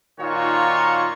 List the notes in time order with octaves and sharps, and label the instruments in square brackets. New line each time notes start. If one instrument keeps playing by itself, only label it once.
[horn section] A#2 D#3 D#4 F4 F#4 C#5